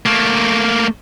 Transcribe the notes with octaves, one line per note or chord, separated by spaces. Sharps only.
A3 A#3